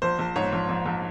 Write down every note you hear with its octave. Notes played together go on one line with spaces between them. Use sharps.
A#1 C5
A#1
G#2 C#5
A#1
A#1
A#1